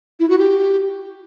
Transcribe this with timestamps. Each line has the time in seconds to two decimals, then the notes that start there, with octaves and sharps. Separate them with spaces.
0.20 E4
0.29 F#4
0.39 G4